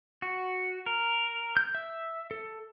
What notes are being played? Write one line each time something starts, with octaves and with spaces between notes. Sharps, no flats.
F#4
A#4
G6
E5
A4